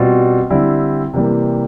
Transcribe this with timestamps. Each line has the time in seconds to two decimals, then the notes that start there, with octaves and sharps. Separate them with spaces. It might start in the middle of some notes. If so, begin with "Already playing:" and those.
Already playing: B2 G3 C4 F4
0.50 D3 G3 C4 E4
1.14 C3 E3 G3 A#3